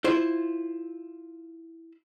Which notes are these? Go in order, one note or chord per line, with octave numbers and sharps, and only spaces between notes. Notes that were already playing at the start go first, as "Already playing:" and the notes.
E4 F4 C5